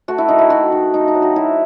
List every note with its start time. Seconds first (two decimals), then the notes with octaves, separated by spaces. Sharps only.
0.08 A3 F#4
0.18 E4
0.28 D#3 D#4
0.39 E4
0.50 D#3 F#4
0.72 D#3
0.94 A3 D#4
1.08 D#4
1.15 F#3
1.22 F#4
1.36 F#3 E4